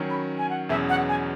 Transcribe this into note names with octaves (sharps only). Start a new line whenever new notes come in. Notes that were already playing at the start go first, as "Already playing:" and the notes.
Already playing: D#3 F#3 C#4
B5
G#5
F#5
E2 B2 F#3 C#4 G#4 E5
F#5
G#5